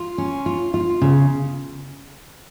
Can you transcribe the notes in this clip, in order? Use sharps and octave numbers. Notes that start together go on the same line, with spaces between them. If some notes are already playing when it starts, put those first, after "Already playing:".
Already playing: F4
C#4
F4
F4
C#3